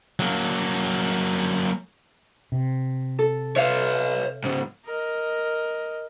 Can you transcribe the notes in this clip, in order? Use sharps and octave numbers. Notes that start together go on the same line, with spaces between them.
F#3 A#3
C3
A4
B4 C#5 E5 F5
G#2 C#3
A#4 D#5